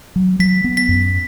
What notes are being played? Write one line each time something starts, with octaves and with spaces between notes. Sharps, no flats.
F#3
F#3 B6
B3
B6
F#2